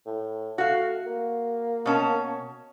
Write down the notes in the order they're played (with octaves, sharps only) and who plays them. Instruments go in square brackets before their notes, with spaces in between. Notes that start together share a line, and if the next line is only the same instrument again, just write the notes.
[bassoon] A2
[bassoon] A3 [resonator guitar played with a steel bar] F#4 F5
[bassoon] A#3
[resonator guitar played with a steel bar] B2 C#4 A5